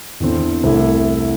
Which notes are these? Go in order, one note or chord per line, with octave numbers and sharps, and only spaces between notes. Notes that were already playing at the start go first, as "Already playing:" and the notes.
E2 D3 C4 E4
C2 C3 A3 E4